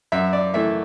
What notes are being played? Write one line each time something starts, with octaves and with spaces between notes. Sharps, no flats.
F#2 E5
D5
E3 A3 E5